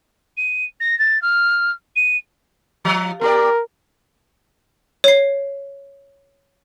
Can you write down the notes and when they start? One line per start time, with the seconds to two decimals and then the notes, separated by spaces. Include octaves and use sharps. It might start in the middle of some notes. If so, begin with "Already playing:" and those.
0.37 D#7
0.80 A#6
0.99 A6
1.22 F6
1.96 D#7
2.85 F3
3.21 B3 G4 A#4 D5
5.04 C#5 C7